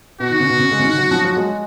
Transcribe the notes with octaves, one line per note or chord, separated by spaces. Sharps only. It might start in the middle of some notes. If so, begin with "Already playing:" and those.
B2 F#4
D#3
C#3
B2
C#3
G#3
C#3
D#3
F#3
F3
F#3
G#3